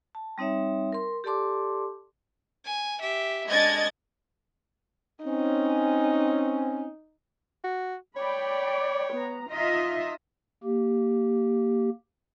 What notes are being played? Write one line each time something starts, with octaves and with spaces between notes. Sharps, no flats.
A5
G3 C4 D#4 C#5 E5
A#4 C6
G4 A4 D5 A5 C6 D6
G#5
G4 E5
G#3 D4 D#5 G#6 A6
C4 C#4 D#4
F#4
C#5 D5 G5 B5
B3 A#5
D#4 F4 D#5 E5
A#3 G4